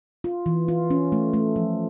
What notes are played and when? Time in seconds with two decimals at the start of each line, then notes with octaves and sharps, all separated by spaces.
0.24 F4
0.46 E3
0.68 F4
0.90 C#4
1.12 A3
1.33 A3
1.56 F3